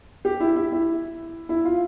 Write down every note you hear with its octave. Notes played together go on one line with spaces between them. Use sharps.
G4
E4
E4
E4
E4
F4